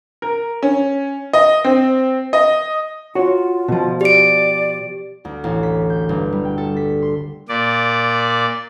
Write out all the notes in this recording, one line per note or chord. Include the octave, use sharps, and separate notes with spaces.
A#4
C#4
D#5
C4
D#5
F4 F#4 C#5
B2 F3
G4 D5 D7
D2
A1
B6
G6
G1
G3
G5
A4
B6
C6
A#2 D5